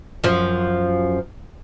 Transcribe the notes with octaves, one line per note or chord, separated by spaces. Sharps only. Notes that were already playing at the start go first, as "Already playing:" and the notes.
F#2 F3